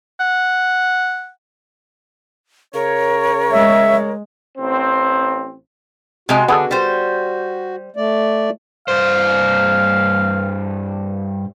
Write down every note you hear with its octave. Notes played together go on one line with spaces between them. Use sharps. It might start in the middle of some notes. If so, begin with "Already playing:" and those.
F#5
C#3 A#4 C#5
G#3 E5
A1 C4
C3 G#3 F#4 D#5
D3 B3 G#4 A4
G3 C5
A3 D5
G2 C5 F5